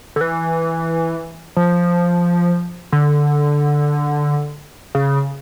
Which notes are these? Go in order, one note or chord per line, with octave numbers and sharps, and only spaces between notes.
D3
E3
F3
D3
C#3